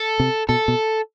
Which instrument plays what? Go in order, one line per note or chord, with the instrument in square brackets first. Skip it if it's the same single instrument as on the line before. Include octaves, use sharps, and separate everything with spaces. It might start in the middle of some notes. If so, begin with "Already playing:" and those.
Already playing: [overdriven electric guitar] A4
[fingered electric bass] C3
[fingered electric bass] B2 [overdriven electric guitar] A4
[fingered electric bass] B2